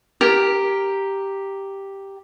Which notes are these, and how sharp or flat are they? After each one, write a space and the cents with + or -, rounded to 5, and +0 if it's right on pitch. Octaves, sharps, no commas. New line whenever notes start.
G4 +0 A#4 +0